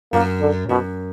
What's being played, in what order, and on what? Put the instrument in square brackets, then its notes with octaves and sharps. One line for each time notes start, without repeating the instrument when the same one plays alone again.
[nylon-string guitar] F#2 [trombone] A#3
[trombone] D3
[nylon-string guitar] F#2 [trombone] B2